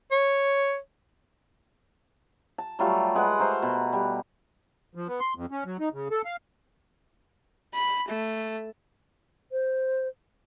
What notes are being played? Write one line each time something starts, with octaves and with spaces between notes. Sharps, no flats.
C#5
A5
F#3 G3 A3 F4
G#3 B4 F#5
A3 A#4 C5
B2
G3
F3
B3
C6
F2
C#4
F#3
D#4
C#3
A4
F5
B5
A3
C5